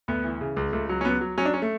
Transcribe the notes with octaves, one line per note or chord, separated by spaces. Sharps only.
D2 B3
E3
C#3
C#2
C#2 A3
F#3
C#4
F#3 B3
F#3
F#3 C#4
D4
C#4
A3